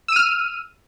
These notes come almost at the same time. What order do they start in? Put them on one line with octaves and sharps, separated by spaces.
E6 D#7 F6